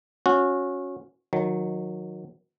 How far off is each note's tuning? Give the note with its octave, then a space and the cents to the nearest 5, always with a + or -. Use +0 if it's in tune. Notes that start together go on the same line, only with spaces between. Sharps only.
C#4 -5 F#4 -25
D#3 +0 F#3 -20